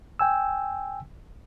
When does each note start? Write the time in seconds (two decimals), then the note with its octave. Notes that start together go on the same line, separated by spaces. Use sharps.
0.19 G5 G#5 E6